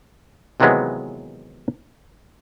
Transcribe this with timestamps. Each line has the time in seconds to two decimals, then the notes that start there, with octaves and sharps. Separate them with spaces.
0.60 D#2 C3 E3 F#3 G#3 B3